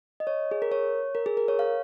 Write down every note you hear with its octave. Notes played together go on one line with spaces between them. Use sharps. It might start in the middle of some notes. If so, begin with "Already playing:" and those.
D#5
C#5
G#4
A#4
C#5
A#4
G#4
A#4
C#5
F5